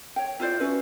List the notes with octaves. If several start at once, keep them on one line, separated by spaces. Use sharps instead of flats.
C#5 G5
E4 F4 C5 D5
C#4 E4 F#4 B4